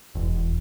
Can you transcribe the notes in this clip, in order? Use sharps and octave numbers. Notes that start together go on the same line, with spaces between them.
E1